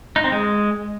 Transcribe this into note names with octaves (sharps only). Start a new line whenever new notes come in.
D#4
C4
G#3